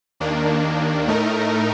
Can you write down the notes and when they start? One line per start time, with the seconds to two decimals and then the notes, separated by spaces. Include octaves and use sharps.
0.20 D#2 D#3 A#3 D4
1.08 A2 A3 D#4 A#4